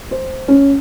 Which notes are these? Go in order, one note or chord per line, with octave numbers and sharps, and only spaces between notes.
C5
C#4